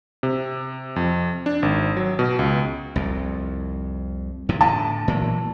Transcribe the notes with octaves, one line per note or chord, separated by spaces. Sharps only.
C3
F2
D4
G#1
F#3
B2
C#2
C2 F2
E2 G2 C3
A2 D3 A5
A#2 E3 F#3